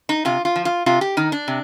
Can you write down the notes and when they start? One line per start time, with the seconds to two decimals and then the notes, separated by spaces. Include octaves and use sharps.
0.09 D#4
0.25 C3 F4
0.45 F4
0.56 F3
0.65 F4
0.86 C3 F4
1.01 G4
1.17 D#3 D#4
1.32 D4
1.48 C3